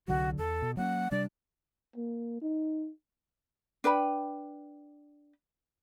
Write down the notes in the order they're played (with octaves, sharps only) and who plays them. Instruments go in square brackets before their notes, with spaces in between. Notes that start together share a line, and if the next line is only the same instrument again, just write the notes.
[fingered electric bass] C2 D3 F#3 [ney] F#4
[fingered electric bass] E2 [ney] A4
[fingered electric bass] B2
[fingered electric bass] F#3 A#3 C#4 [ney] F#5
[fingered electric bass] C3 G3 D4 [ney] D5
[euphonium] A#3
D#4
[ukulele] D4 B4 G5 B5